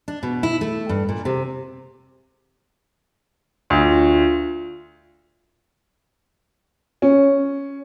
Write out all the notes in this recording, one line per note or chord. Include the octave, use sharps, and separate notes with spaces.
D4
B2
E4
A3
G2
A#2
C3
D2 F4
C#4